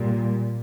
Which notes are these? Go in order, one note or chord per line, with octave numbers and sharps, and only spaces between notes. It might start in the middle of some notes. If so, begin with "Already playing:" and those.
Already playing: A#2 G3